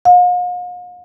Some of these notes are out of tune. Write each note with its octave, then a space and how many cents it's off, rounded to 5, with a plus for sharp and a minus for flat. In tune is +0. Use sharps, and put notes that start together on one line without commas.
F5 +45